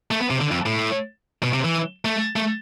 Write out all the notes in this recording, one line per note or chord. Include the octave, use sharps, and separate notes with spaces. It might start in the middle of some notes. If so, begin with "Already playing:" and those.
A3
B3
C3
D3
F2
A2
B2
C3
E3
A3
A3